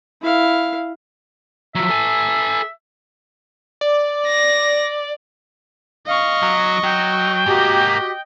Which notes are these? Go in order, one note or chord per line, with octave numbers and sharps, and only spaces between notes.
E4 F5
F3 F#3 E5
A4 G#5
D5
A#6
D#5 F5 C#6
F#3
F#3 G5
G#2 A#3 F#4 G4 D#5